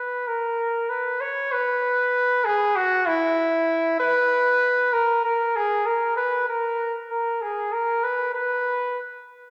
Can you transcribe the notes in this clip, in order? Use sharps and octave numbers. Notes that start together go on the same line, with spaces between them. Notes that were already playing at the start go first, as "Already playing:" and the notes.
Already playing: B4
A#4
B4
C#5
B4
G#4
F#4
E4
B4
A#4
A#4
G#4
A#4
B4
A#4
A#4
G#4
A#4
B4
B4